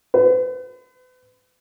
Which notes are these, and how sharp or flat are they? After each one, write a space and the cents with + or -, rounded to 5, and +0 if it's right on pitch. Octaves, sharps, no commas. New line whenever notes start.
B4 +40